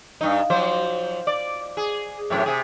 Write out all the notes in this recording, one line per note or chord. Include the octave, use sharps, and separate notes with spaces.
G2 D#4
F3 F#3 C5
D5
G#4
F#2 A2 C3
C3 G#4